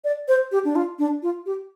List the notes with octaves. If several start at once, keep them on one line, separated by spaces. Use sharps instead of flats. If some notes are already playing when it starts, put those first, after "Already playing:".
D5
C5
G4
D4
F4
D4
F4
G4